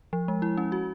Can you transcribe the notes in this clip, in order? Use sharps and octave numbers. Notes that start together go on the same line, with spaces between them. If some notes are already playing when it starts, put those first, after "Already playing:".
F3
G#3
E4
C#4
F#4